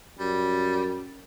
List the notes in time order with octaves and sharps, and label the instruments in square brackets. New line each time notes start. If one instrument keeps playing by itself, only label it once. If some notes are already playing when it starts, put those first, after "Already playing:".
[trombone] F#2 [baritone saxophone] G3